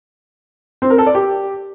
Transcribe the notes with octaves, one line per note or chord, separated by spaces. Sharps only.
C4
A#4
A4
D5
G4